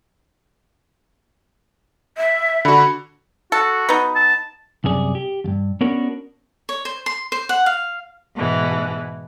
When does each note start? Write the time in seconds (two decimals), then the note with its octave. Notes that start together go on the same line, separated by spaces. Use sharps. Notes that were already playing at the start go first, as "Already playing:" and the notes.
2.17 E5
2.65 D3 F#4 B5
3.52 F#4 A4
3.89 B3 D#4
4.15 A5
4.84 C2 F#2 C3 G#4 D5
5.15 G4
5.44 E2 G2
5.81 B3 C#4 D4 F#4 A#4 C#5
6.69 C#5
6.85 C5
7.06 C6
7.32 C5
7.49 F#5
7.66 F5
8.35 G#2 B2 E3